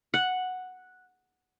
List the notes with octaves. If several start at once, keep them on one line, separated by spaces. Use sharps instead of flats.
F#5